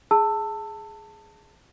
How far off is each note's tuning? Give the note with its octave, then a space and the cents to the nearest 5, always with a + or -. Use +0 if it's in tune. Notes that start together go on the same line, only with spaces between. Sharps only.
G#4 +0 A5 +20 E6 +0